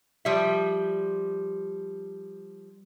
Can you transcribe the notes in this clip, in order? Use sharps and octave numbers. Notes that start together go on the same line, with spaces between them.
F3 G3 E5